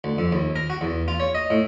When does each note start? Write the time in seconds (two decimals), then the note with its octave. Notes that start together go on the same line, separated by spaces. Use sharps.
0.04 D2
0.18 F2
0.32 D#2
0.56 A#4
0.70 F#4
0.81 E2
1.08 F4
1.20 C#5
1.35 D#5
1.50 A2